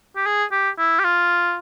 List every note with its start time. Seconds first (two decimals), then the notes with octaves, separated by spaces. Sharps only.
0.16 G4
0.26 G#4
0.52 G4
0.78 E4
0.99 G4
1.04 F4